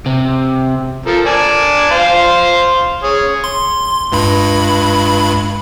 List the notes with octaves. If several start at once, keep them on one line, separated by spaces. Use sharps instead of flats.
C3
F3 A4 A#4
D5 G#5 A5
C5 F5 C6
G#4 C#5
C6
C#2 G2 B5